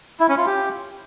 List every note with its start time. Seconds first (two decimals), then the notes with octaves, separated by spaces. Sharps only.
0.20 E4
0.29 C#4
0.38 F4
0.46 G4